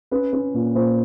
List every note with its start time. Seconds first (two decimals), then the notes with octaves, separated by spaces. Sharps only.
0.11 C#4 B4
0.33 C#4
0.54 A#2
0.75 A#2 C5